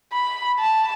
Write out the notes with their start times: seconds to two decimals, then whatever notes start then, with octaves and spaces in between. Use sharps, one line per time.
0.13 B5
0.60 A5